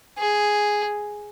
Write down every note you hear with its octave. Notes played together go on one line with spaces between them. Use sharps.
G#4